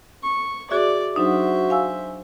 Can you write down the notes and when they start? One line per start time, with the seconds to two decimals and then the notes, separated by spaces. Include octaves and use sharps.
0.23 C#6
0.71 F#4 G#4 D5 E5
1.16 F#3 D4 D#4 F#4 C5 E5
1.70 F5 G#5 E6